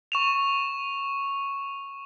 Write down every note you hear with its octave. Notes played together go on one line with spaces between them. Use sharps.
C#6 E7 F7